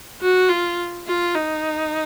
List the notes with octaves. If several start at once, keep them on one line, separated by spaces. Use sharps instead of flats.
F#4
F4
F4
D#4